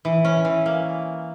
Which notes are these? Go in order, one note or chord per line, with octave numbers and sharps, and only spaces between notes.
E3
C#4
E3
A#3